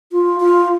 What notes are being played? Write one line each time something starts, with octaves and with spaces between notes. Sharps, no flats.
F4
F4